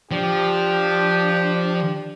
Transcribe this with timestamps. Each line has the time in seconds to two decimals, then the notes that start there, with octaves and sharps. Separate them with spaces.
0.11 F3 D4 G4